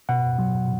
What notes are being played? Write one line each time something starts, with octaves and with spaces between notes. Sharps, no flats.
B2 F#5
F#3